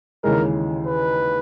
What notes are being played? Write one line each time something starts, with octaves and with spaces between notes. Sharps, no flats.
D#2 C#3 E3 G#3 A#4
B4